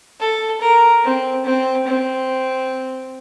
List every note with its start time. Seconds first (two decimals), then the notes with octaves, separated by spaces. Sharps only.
0.20 A4
0.61 A#4
1.04 C4
1.46 C4
1.87 C4